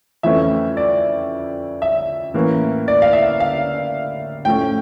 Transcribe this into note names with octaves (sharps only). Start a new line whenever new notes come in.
F2 E3 A3 C#4 E5
D5
E5
A2 E3 A#3 C#4
D5
F5
E5
F5
A2 F3 A3 C#4 G5